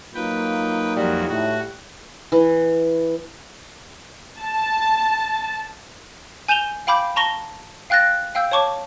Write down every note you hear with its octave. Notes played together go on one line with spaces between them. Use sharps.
F#3 A#3 D#4 F4 B4 G5
F2 G3 F#4
A2 F#4
E3
A5
G#5 G6 E7 F7 G7
F5 G5 B5 D6 G6
A5 A#5 C#6 A#6 G7
F5 G5 F#6 A6 A#6
F5 G5 E6 G6
C#5 A5 C#6 D6